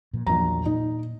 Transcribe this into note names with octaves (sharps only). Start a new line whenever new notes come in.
A#2 F3
A#1 E2 F#3 A#5
A#2 D#4